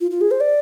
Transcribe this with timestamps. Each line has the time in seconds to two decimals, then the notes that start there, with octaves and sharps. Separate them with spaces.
0.01 F4
0.11 F4
0.21 G#4
0.31 C5
0.41 D5